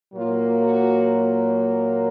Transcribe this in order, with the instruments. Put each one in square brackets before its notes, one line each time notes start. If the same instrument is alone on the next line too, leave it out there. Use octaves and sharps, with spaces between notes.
[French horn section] A#2 F#3 A#3 F4
F#4